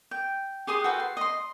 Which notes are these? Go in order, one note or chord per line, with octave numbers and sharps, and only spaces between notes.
G5
G4 G#4 C6 D#6
F#4 A4 B4 G5
C6
D#5 C6